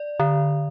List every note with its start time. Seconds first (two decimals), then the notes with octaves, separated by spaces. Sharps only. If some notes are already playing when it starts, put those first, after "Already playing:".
Already playing: D5
0.20 D3